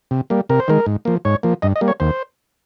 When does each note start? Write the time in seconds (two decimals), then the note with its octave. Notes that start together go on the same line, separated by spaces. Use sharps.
0.11 C3
0.30 G3 A#3
0.49 C3 A#4
0.60 C5
0.68 D#3 G#3 A#4
0.86 G#2
1.05 F3 A#3
1.25 G#2 C#5
1.43 F3 A#3
1.62 G2 D#5
1.76 D#5
1.81 G3 A#3
1.88 C#5
2.00 D#2 C5